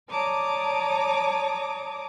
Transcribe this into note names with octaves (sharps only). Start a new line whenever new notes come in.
C#5 D5 A5 A#5 D6 D#6